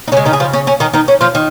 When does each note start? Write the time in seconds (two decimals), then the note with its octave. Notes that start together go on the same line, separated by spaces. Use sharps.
0.08 D#4
0.12 C#3 G#3 C#4
0.25 D#3 D#4
0.33 G#4
0.40 F3 F4
0.53 C#4
0.67 C#4
0.80 D#3 D#4
0.93 D#3 D#4
1.08 C#4
1.21 F3 F4
1.35 D#3